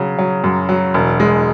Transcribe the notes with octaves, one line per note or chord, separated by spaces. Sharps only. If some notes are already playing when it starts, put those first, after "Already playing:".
Already playing: C#3 F#3
F#3
F#2
F#3
E1
G#3